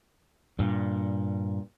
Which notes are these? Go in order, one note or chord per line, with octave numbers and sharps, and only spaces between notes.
G2 A#2